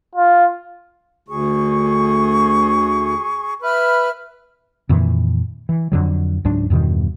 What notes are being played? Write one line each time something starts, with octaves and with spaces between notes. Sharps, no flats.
F4
D2 G#4 C#6
B4 E5 F6
F2 A#2 D#3 E3
E3
F2 D3 F#3
C#2 G#2 F#3 D4
E2 G2 B2 D#3